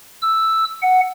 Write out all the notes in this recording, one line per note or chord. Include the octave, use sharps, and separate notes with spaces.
E6
F#5